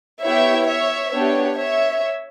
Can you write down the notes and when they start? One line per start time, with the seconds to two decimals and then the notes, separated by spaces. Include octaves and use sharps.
0.23 B3 E4 G4 C#5 E5
0.67 C#5 E5
1.13 B3 D4 G4 C#5
1.58 C#5 E5